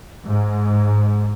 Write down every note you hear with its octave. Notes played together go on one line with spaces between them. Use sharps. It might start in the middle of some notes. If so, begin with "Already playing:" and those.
G#2